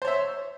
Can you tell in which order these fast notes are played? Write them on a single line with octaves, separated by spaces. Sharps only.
C5 C#5 E5